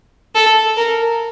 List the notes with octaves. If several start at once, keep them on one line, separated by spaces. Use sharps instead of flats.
A4
A#4